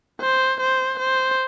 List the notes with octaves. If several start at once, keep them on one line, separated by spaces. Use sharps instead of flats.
C5
C5
C5